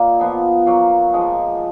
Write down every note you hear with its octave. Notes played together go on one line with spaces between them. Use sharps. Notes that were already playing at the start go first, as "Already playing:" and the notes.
Already playing: A#2 A#3 D#4
F3 B3 F4
F#3 A#3 F4
F3 G#3 D#4